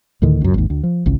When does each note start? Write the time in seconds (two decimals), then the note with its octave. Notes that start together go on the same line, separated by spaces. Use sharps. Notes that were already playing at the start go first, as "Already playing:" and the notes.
0.22 D2 A2 D3 D#3
0.41 C#2 F#2
0.54 G#1 D#2
0.70 D2
0.83 F3
1.06 G#1 C#2